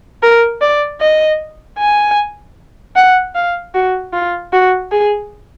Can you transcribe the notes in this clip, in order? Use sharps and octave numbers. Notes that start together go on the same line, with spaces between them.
A#4
D5
D#5
G#5
F#5
F5
F#4
F4
F#4
G#4